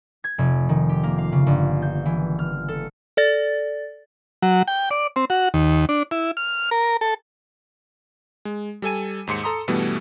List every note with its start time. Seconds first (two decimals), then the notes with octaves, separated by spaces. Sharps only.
0.24 G#6
0.38 F1
0.69 D#3
0.89 G4
1.03 A#3
1.18 F5
1.32 C#3
1.47 G1
1.82 G6
2.06 E3
2.39 F6
2.68 A4
3.17 A4 D5 A6
4.42 F#3
4.68 G5
4.91 D5
5.16 C4
5.30 F#4
5.54 D#2
5.89 D4
6.11 E4
6.37 F6
6.71 A#4
7.01 A4
8.45 G#3
8.82 G3 A4 G#5 D#7
9.27 D#2 G#2 C6 C#7
9.44 A4 A#5 C6 D#6
9.68 G2 B2 E3 G3 A3 B3